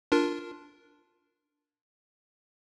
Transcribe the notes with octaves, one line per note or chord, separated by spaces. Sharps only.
D4 F4 A#4